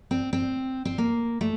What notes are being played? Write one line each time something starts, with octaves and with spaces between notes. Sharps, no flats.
C4
C4
C4
A#3
A3